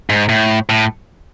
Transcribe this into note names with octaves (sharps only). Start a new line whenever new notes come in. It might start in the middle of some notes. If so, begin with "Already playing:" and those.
G#2
A2
A2